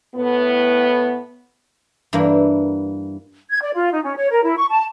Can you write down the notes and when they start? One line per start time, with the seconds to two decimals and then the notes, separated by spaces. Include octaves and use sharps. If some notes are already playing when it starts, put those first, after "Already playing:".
0.15 A2 B3
2.13 G2 E3 A#3 D4 A#4
3.50 G#6
3.62 D5
3.75 F4
3.93 D#4
4.05 C#4
4.16 C#5
4.31 A#4
4.44 E4
4.58 C#6
4.70 A5